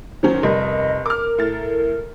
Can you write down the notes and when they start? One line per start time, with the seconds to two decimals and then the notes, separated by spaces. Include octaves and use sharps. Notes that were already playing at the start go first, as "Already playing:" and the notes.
0.23 D#3 F#3 C#4 C5
0.43 F1 G3 A#4 D#5
1.06 A#4 D6 F6
1.38 A2 A6